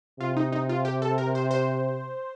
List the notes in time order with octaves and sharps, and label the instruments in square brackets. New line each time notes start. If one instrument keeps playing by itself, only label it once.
[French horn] C3 [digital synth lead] F4
[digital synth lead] D#4
D#4
F4
G4
A4
A#4
C5
C5